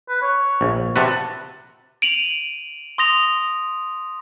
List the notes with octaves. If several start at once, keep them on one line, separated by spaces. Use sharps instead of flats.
B4
C#5
A#1
C3 F#4 B4 A5
D7 D#7 F7 F#7
C6 D#6 A#6 F7